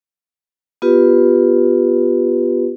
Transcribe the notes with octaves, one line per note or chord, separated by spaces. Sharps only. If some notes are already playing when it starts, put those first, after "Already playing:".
B3 F4 G4 B4